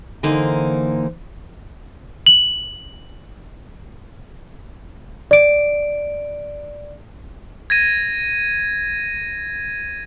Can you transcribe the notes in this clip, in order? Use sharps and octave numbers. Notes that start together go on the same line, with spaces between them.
D3 E3 A#3 D#4 C5
F#7
D5 D7
G#6 A#6 D#7